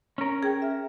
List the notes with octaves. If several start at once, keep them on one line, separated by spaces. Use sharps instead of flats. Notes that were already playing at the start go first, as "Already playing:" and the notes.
C#4 A#4
G#4 G5
E5 F6